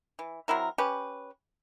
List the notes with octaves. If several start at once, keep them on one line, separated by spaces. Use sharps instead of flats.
E3
F#3 C4 E4 A#4
C#4 G4 B4